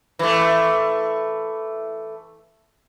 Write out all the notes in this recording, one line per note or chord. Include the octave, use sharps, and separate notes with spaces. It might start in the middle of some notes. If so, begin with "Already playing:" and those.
E3 A3